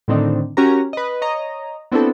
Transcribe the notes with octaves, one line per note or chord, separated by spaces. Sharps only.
A2 D3 D#3 C4 D4 D#4
C#4 F#4 G4 A#4 A#5
B4 D#5
C#5 D#5 A#5
B3 C4 D4 E4 F#4 A4